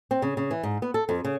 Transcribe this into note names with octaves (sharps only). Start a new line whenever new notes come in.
C4
C#3
C#3
E3
G#2
B3
A4
F2
C#3